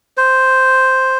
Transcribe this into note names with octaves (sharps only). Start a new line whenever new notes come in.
C5